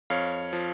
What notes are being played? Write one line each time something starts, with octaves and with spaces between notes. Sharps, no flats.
F2 C#5 F5
F3